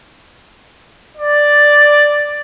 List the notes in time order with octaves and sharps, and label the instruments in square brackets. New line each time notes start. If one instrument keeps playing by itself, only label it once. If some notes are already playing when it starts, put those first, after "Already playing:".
[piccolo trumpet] D5